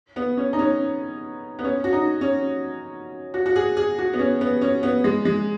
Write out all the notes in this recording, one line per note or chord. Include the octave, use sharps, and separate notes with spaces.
B3
C#4
D#4
C#4
B3
C#4
F#4
D#4
C#4
F#4
F#4
G#4
G#4
F#4
B3
C#4
B3
C#4
B3
G#3
G#3